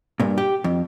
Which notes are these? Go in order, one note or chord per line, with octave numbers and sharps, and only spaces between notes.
G2 A#2
G4
F2